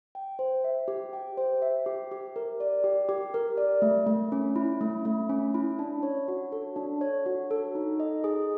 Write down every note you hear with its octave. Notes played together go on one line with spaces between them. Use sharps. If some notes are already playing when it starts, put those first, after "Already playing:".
G5
C5
E5
G4
G5
C5
E5
G4
G4
A#4
D5
G4
G4
A#4
D5
A3
A3
C#4
E4
A3
A3
C#4
E4
D4
C#5
F#4
A4
D4
C#5
F#4
A4
D#4
D#5
G#4